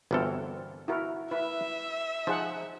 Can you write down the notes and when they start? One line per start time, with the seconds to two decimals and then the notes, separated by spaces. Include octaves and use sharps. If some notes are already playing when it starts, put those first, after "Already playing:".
0.11 G1 E3 C4 F#4 A4 A#4
0.88 E4 F#4 A#4
1.31 E4 B4 E5
2.27 F3 D#4 G#4 F#5